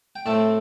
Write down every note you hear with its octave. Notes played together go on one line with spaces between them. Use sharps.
G5
A2 A3 C4 E5 A5